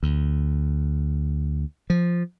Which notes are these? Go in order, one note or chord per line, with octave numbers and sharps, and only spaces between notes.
D2
F3